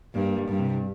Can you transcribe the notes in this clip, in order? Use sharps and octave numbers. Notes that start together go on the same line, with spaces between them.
G2 A#3
G3
G2
C3